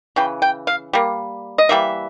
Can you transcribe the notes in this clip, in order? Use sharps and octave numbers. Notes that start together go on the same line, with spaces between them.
C#3 E3 G5
G5
F5
G3 A#3
D#5
E3 G3 A#3 E5